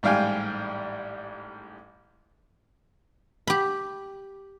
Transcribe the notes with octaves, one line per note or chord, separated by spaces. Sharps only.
A1 G#2 G3 F5 G5 G#5
G4 B5